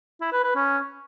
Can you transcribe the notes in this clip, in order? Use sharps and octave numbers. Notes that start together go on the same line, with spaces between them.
E4
B4
B4
C#4